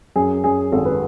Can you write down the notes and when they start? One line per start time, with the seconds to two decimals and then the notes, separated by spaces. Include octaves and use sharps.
0.16 F#2 G#4
0.44 F#2 G#4
0.72 G#1 A4
0.85 B4